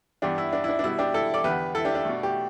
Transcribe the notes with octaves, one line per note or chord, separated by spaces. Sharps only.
G2 E3 B3 D4 G4
E4
D4
E4
D4
D4
B2 G3 B3 E4
D4 G4
E4 A4
A4 D5
E2 D3 B3 G4 B4
E4 A4
D4 G4
D4
B2 A3
G4